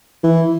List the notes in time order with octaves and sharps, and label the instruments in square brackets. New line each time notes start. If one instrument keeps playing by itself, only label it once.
[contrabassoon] E3